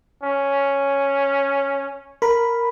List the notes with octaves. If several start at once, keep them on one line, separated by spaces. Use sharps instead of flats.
C#4
A#4 B5